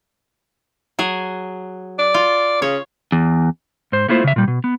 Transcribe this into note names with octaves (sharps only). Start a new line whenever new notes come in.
F#3 G#4
D5
F4
C#3 C#5
E2
G#2 C5
A3 A#3 E4 F4 C5
C#3 E5
A#2 G3
B2
B3